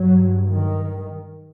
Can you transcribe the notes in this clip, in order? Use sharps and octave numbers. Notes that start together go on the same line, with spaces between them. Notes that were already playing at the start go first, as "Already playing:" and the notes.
Already playing: G2 F#3
D#3